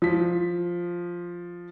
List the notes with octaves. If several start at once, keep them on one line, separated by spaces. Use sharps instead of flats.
F3 B6